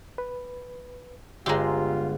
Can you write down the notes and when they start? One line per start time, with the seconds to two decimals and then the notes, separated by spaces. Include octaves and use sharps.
0.18 B4
1.46 G1 G#3 F4 G4 A#5 C6 E6